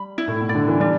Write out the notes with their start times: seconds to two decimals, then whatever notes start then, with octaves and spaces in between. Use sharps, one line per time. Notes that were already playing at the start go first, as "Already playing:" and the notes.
Already playing: G3 B5
0.18 E4
0.28 A2
0.41 B2
0.49 D5
0.55 D3
0.68 E3
0.80 G3 D4